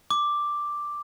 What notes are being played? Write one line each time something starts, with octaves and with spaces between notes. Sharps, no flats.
D6